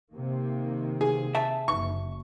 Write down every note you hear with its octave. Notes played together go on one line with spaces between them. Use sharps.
C3 D#3 A#3
G#4
E5 A5
F#1 C#6